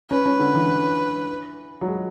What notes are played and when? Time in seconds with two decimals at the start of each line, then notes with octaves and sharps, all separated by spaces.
0.10 C#4 B4
0.26 C#4
0.39 D3
0.55 E3
1.81 F#3
1.88 G#3